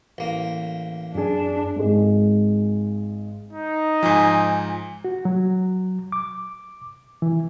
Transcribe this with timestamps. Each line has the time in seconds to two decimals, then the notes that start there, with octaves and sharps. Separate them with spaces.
0.18 A1 A#3
1.15 F#2 D4 G#4
1.76 G#1 G#3
3.53 D#4
4.03 G#2 F3 G#5
5.05 F#4
5.25 F#3
6.12 D6
7.22 E3